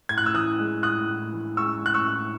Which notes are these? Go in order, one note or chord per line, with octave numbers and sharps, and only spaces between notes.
A2 G#6
F#6
E6
E3 D#6 F#6
G#3
A2 D#6 F#6
A2
E3
G#3 C#6 E6
A2 F#6
C#6 E6
A2